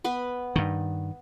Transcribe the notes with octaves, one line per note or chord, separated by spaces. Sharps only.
B3 B4 B5
G2 D#3